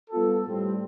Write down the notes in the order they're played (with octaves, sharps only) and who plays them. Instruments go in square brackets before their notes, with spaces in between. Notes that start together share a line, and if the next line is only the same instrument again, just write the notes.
[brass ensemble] G3 B3 F4 A4
A2 G3 C4